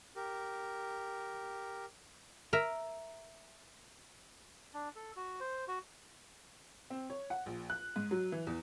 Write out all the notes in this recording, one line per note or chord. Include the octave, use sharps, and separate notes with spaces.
G4 A#4
A#4 E5
D4
A4
F#4
C5
F#4
C4
C#5
F#5
A#1
F#6
G#2
F#3
E3
E2